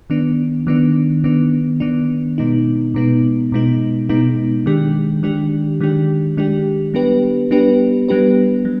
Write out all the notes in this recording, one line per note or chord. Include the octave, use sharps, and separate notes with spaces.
D#3 B3 D4
D#3 B3 D4
D#3 B3 D4
D#3 B3 D4
B2 G#3 B3 D#4
B2 G#3 B3 D#4
B2 G#3 B3 D#4
B2 G#3 B3 D#4
D#3 G#3 D4 G4
D#3 G#3 D4 G4
D#3 G#3 D4 G4
D#3 G#3 D4 G4
G3 B3 D4 G4 B4
G3 B3 D4 G4 B4
G3 B3 D4 G4 B4
G3